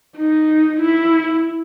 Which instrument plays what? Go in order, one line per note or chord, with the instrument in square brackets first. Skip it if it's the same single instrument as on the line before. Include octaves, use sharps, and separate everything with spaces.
[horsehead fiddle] D#4
E4